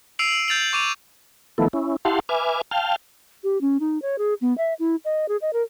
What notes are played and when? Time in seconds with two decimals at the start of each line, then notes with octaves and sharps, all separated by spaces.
0.19 E6 C7 D7 D#7 F7 F#7
0.48 G6 A6 F7 F#7
0.73 C#6 D6 D#7 F7
1.58 D#3 F3 A3 B3 E4 A4
1.73 C#4 E4
2.05 E4 G4 F5 F#5 A5 C6
2.29 B4 E5 G#5 D6 F6
2.71 F5 G5 A5 F6
3.44 G4
3.61 C#4
3.80 D#4
4.02 C#5
4.18 G#4
4.41 B3
4.58 E5
4.79 E4
5.05 D#5
5.28 G#4
5.42 D#5
5.53 A#4